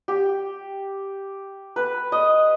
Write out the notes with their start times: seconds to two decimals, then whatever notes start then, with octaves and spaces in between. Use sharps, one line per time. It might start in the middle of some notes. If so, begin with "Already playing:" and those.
0.08 G4
1.76 B4
2.12 D#5